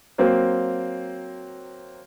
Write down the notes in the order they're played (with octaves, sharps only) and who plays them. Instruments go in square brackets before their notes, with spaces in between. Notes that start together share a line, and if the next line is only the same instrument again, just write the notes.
[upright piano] F#3 A#3 C4